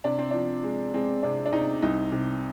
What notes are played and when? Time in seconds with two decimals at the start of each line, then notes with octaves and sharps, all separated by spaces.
0.04 C3 D4
0.19 C4
0.31 F3 D4
0.63 G#3
0.94 G#3 C4
1.23 C3 D4
1.45 D4
1.52 C3 D#4
1.82 C2 D#4
2.12 C3